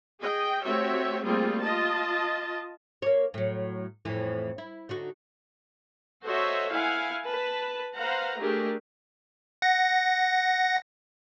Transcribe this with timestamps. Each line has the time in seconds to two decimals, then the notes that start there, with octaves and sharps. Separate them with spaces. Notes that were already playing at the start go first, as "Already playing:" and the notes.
0.19 G#4 D#5 G5
0.63 A3 C4 F#4 G4 C#5 E5
1.23 G3 A3 A#3 C4 F4 G#4
1.61 F4 D#5 A5
3.02 A#3 C#5
3.34 A2 F#3
4.05 F2 A2 E3
4.58 E4
4.89 D3 D#4 F#4
6.25 F#4 A4 C5 C#5 D#5 E5
6.70 E4 F5 F#5 G#5
7.26 B4 A5
7.96 B4 C5 F5 F#5 A#5
8.39 A3 D4 G4 G#4 A#4
9.62 F#5 A#6